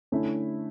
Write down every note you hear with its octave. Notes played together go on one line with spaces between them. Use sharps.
D3 A3 C#4 E4